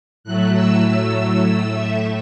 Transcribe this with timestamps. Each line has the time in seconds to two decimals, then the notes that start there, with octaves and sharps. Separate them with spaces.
0.24 A2 F#3 A3 F#6
0.54 E6
1.43 A2 A3 E6
1.73 E5